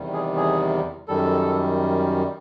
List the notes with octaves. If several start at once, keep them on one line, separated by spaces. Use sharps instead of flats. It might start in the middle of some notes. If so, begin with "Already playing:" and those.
Already playing: E2 C3 D#3 G3
G#4
G#4
F#2 D#3 G3 A4